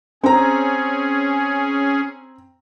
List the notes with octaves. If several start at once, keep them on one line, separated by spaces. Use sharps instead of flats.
C4 C#4 G#4 A#5